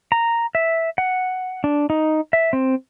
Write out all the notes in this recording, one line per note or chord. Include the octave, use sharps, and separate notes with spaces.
A#5
E5
F#5
D4
D#4
E5
C4